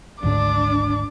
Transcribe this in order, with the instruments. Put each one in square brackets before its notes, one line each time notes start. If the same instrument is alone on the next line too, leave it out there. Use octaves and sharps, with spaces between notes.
[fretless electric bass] G#1 D2 G#2 [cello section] D4 [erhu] D6